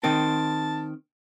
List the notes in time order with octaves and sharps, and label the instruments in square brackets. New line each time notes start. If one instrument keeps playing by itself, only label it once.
[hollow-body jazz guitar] D#3 C4 [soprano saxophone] A5